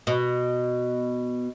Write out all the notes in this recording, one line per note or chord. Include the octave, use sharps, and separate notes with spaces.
B2